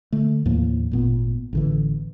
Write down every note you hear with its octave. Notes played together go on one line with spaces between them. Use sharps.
D3 A3
D#2 A2 F3 A#3
G#1 A#2 B3
A1 D3 E3